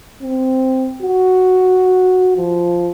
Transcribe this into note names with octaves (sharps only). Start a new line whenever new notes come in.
C4
F#4
F3